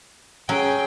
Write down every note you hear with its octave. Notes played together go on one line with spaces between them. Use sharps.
F#3 C#4 G#4 G5